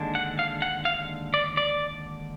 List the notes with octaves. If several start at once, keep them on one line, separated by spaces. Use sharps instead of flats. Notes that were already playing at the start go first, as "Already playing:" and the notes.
Already playing: D#2 D3 G#3 D4
F#5
F5
F#5
F5
D5
D5